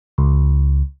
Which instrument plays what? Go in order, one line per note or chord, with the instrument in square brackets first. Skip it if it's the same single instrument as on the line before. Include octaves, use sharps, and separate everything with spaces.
[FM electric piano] C#2